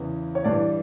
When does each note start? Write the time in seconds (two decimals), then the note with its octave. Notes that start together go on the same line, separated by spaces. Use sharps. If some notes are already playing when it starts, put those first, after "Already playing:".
Already playing: E2 C#3 E3
0.35 C#5
0.44 G2 E3 D5